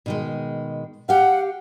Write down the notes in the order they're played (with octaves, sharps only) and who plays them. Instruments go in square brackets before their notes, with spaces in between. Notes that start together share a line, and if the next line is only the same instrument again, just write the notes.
[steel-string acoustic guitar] B2 D#3 G#3
[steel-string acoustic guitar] G4 F5 [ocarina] F#5